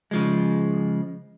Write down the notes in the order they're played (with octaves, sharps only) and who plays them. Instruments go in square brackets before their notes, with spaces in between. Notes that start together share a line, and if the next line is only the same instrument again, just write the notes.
[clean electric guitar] C#3 F3 G#3